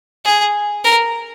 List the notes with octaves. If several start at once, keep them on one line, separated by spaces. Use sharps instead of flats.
G#4
A#4